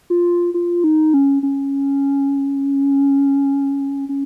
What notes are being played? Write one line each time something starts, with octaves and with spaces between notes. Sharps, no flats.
F4
F4
D#4
C#4
C#4
C#4